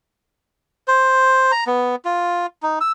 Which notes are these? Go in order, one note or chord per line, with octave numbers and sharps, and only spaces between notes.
C5
A#5
B3
F4
D#4
E6